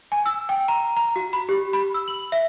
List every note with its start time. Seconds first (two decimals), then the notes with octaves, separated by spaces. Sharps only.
0.12 G#5
0.26 E6
0.49 G5
0.68 A#5
0.97 A#5
1.16 F#4
1.33 B5
1.49 G4
1.73 B5
1.94 E6
2.08 F#7
2.32 E5